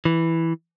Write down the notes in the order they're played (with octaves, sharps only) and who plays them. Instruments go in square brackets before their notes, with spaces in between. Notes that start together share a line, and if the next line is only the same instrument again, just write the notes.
[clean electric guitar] E3